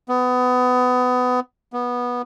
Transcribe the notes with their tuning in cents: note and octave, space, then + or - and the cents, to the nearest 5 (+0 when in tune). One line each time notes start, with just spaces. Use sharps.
B3 +25
B3 -15